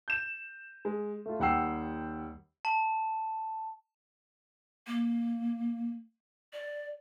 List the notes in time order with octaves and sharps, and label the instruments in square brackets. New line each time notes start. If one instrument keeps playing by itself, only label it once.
[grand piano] G6 E7
G#3
A3 F4
D#2 G3 F#5 G5 E6 C7
[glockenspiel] A5
[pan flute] A#3
D5